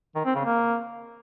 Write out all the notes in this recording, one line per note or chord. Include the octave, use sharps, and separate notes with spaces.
D#3
C4
C#3
A#3